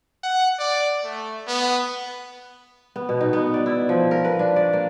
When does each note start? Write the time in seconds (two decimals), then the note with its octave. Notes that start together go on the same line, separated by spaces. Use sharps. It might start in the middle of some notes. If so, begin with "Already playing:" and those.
0.24 F#5
0.59 D5
1.04 A3
1.48 B3
2.96 B3
3.09 B2
3.21 D#4
3.33 B3
3.54 D5
3.66 E4
3.89 F3
4.11 A#4
4.25 B4
4.39 D4
4.56 D5
4.73 A#3